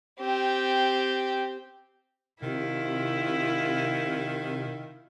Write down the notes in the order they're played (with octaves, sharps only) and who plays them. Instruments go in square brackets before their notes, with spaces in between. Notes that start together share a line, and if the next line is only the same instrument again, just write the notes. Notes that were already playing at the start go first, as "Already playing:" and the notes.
[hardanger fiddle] C4 G4
[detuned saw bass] C3 [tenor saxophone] D#3 [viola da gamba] E4 F4